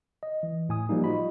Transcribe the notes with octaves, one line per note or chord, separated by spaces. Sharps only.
D#5
E3
A2 G#5 D#6
F3 G3 A#3 D#4
F4 F#4 D#5 B5